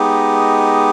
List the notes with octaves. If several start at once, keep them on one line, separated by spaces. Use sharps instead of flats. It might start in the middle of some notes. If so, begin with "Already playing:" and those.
Already playing: G#3 B3 D#4 G4